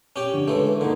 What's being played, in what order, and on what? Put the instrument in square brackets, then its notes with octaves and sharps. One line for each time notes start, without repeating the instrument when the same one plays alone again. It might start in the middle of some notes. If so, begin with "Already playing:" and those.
[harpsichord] C#4 G4 G5
[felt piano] D3
[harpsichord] C#2 E3 A3
[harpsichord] D3 [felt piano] A#3 D#4